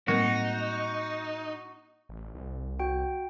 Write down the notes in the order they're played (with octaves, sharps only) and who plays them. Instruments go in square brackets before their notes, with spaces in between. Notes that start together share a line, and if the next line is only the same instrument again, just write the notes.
[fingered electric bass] A2 F#3 G3 [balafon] A#3 C4 A#4 [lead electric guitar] D#4 [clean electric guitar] F#4
[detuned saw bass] A1
C2
[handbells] F#4 G5